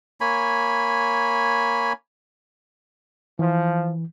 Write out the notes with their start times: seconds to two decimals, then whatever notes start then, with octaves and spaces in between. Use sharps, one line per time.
0.21 A#3 C#5 G#5 B5
3.39 E3 F3